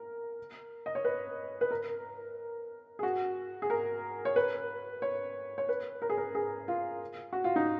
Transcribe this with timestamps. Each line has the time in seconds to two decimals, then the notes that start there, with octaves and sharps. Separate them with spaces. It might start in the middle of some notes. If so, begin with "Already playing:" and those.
Already playing: A#4
0.86 D#5
0.95 C#5
1.05 B4
1.61 B4
1.71 A#4
2.99 G#4
3.03 F#4
3.62 G#4
3.70 A#4
4.25 C#5
4.36 B4
5.02 C#5
5.58 C#5
5.69 B4
6.02 A#4
6.10 G#4
6.17 A#4
6.35 G#4
6.68 F4
7.33 F#4
7.44 F4
7.56 D#4